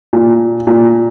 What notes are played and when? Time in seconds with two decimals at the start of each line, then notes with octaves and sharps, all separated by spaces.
0.13 A#2
0.67 A#2